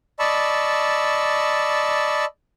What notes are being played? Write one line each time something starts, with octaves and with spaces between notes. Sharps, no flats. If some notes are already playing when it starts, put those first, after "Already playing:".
D5 D#5 A5 B5 C#6 E6